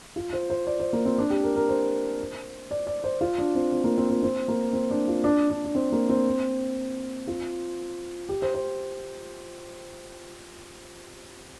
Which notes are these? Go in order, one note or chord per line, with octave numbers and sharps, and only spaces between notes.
F4
C5
C5
D5
C5
A#3
C4
D4
G4
A#4
A#4
C5
D5
D5
C5
F4
D4
C4
C4
A#3
C4
C4
C4
A#3
C4
D4
F4
D4
D4
D4
C4
A#3
C4
F4
G4
C5
C5